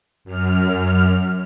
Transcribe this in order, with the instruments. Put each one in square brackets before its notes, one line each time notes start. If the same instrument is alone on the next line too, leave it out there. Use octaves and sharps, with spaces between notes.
[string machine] F#2 F6